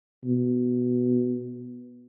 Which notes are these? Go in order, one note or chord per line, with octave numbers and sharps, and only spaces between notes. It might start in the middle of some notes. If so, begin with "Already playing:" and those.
B2